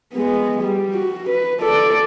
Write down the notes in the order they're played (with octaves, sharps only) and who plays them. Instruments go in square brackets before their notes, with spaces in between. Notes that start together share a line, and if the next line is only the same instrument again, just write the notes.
[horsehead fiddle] G#3 B3
G3
F#4
B4
A4 D5